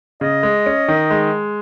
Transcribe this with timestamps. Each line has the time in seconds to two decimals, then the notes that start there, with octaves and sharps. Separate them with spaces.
0.21 C#3 D#5
0.43 G#3
0.66 C#4
0.88 D#3
1.11 G#3